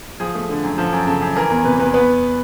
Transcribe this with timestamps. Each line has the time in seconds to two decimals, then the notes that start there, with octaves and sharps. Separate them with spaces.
0.20 F3 G#4
0.35 A3
0.49 D3
0.63 F#2
0.78 F3 A4
0.93 F#2
1.07 C#3 A4
1.21 F#2
1.36 E3 A#4
1.50 E2 A#4
1.65 C3 B4
1.79 E2 B4
1.94 B3 B4